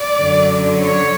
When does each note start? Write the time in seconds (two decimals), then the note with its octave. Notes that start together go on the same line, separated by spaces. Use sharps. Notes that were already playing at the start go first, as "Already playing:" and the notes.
Already playing: D5
0.18 F#2 D3 F#3
0.81 C#5